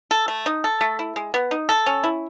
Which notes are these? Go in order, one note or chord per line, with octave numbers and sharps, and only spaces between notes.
A4
A3
D#4
A4
A3
E4
G#3
B3
D#4
A4
C#4
E4